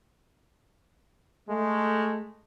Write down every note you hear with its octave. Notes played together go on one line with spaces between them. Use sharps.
G#3 A3